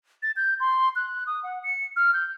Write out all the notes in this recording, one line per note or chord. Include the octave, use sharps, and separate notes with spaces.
A6
G6
C6
F#6
D#6
F#5
C#7
F6
G6